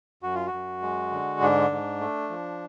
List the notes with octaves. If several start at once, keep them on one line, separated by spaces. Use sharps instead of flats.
F#2 F#4
F4
F#4
F#2
G#3
D3
G#2 D4
G#2
A3
F3